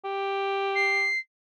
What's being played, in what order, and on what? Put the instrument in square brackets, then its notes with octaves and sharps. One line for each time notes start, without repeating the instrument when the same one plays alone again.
[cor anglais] G4
[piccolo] C7